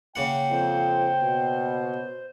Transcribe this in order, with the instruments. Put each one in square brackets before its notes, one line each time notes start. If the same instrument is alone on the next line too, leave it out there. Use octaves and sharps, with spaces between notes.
[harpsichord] C#3 A#3 F#5 [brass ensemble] G5
[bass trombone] F2 [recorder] C5
[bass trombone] B2